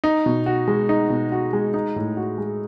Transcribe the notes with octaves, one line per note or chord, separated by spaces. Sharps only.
D#4
B2
F#4
G#3
D#4
B2
F#4
G#3
D#4
A2
F#4
G#3